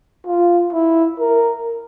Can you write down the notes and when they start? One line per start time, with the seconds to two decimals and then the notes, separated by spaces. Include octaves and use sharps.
0.26 F4
0.73 E4
1.20 A#4